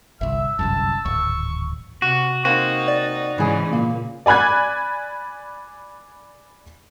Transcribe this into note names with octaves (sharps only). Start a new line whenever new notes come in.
G1 C2 E5 E6
G1 C2 F#2 A5
D1 G#1 C#6
C3 F#4
A#3 C4 D#4 F#4
D5
G#2 C#3 E3 G#4
A#2 A#3
D5 G#5 B5 F#6 G#6